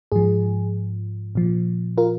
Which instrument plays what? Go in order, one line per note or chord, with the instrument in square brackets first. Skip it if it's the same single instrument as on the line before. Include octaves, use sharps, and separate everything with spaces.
[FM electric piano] G#2 F3 G#4
A#2 F3
F4 A#4